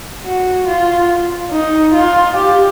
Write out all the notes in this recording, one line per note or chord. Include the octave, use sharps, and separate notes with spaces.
F#4
F4
D#4
F4
G4